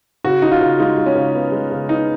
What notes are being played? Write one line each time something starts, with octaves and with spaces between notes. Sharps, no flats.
C#3 F#4
C#3 D#4
F4
C#3
G#3 D#4
G#3
C#4
C#3
B3
G#3
C#3
B3 D#4